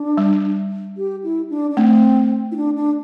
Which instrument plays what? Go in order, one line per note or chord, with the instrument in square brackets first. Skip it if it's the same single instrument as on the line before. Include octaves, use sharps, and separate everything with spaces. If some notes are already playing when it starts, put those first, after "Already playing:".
Already playing: [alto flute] D4
[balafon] G3
[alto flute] G4
E4
D4
D4
[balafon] A3 [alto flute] C4
[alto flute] E4
D4
D4